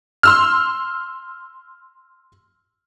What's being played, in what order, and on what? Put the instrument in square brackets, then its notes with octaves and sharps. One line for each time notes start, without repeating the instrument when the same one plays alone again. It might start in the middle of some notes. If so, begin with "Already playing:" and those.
[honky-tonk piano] C6 E6 F6